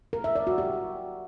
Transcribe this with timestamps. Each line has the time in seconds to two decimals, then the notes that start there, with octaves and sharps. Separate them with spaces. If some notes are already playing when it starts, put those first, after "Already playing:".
0.13 A#4
0.24 E5
0.36 D5
0.47 F#4
0.58 G4